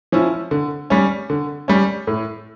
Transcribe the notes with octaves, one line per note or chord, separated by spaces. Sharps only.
F3 C#4 E4
D3
G3 C#4
D3
G3 C#4
A2